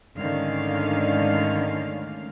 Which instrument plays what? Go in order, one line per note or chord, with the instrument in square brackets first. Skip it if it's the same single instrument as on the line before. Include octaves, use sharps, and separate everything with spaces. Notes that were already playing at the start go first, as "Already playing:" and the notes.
[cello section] G#2 D3 D#3 A3 C#4 F5